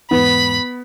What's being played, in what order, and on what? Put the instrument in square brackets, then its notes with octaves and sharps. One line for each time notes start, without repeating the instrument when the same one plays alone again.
[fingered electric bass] E2 G#2 [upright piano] B3 [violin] B5